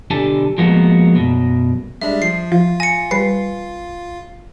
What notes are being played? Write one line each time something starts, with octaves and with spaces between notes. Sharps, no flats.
B1 D3 G4 G#5 A5
F3 G#3 A#3 B3 F#4
F#2 B2
G3 G#3 D4 E5
F3 C7
F3 F4
G#5 A#6 C#7
G3 B4 C7